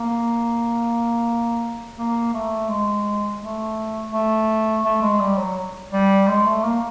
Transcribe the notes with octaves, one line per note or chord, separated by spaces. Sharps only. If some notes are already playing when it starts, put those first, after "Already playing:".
Already playing: A#3
A#3
A3
G#3
A3
A3
A3
G#3
G3
F#3
G3
G#3
A3
A#3